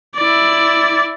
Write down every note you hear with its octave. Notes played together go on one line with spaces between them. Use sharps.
E4 D5